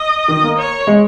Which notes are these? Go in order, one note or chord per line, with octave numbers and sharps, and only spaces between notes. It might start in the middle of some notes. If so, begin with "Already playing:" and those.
Already playing: D#5
D#3
A#3
C#5
G#3